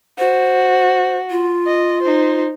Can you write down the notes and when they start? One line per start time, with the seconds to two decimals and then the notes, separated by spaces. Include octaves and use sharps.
0.18 F#4 C5
1.30 F4
1.67 D#5
2.02 D#4 C5